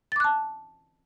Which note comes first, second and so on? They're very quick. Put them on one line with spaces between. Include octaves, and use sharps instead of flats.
A6 D6 F#6 A5